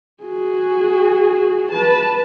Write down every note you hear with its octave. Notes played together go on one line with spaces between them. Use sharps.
F#4 G#4
B4 A5